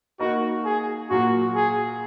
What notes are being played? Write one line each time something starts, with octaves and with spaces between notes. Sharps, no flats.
A#3 D#4 F#4 A#4 D#5
G#4
A#2 F#3 A#3 F#4
G#4